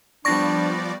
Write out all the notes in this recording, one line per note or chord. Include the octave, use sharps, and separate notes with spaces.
F3 G3 B3 D4 D5 C#6 A#6